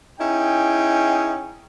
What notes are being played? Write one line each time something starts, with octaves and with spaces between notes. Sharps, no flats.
C#4 D#4 E4 G#4 G5